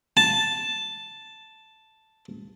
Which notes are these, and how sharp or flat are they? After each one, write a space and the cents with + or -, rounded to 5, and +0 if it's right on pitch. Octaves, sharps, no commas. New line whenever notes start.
A5 +0